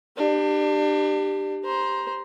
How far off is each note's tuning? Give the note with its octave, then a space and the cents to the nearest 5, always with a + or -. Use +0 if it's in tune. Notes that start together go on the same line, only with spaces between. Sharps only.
D4 +35 G4 +0
C5 +0 A#5 +25